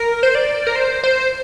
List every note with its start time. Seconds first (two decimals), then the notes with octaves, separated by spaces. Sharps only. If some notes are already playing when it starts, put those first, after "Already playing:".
Already playing: A#4
0.23 C5
0.35 D5
0.67 A#4
0.76 C5
1.03 C5